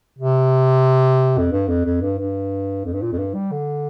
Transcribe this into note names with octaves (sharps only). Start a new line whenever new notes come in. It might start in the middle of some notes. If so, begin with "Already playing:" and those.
C3
F2
G2
F2
F2
G2
G2
F2
G2
A#2
F2
G2
G3
D3